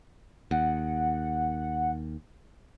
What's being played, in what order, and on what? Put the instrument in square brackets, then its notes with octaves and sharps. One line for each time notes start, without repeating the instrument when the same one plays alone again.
[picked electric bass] D#2 [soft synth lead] F#5